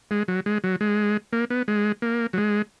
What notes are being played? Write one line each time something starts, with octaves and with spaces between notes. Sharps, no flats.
G#3
F#3
G#3
F#3
G#3
A#3
B3
G#3
A#3
F#3
G#3